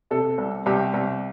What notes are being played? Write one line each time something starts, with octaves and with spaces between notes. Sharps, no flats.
C3 A4
C2
C2 G4
C2